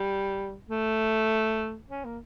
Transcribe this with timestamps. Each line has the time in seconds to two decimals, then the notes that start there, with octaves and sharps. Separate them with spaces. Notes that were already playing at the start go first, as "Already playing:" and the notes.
Already playing: G3
0.69 A3
1.89 C#4
2.05 A#3